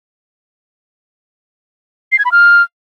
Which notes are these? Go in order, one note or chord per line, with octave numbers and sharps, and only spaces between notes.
C7
G#6
B5
F6